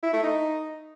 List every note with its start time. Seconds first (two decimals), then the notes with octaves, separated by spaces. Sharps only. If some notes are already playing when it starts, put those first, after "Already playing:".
0.03 E4
0.13 A3
0.23 D#4